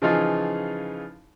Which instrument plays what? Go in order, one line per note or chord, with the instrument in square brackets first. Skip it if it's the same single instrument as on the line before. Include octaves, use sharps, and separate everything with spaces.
[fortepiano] C#3 E3 F3 D#4 F4 G#4